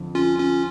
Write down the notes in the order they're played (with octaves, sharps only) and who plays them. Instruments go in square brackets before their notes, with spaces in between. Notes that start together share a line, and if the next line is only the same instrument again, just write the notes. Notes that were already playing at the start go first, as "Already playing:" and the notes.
Already playing: [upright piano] F2 D3 F3
[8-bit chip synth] C#4 F4
C#4 F4